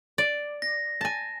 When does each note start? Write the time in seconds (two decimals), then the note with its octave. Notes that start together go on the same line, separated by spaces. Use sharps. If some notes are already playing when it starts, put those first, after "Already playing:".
0.18 D5
0.62 A#6
1.01 G#5 A5